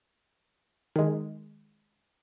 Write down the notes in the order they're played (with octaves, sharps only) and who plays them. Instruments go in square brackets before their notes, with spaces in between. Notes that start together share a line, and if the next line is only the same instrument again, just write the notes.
[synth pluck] D#3 G#3